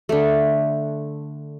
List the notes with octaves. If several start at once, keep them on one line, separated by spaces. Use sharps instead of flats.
D3 A3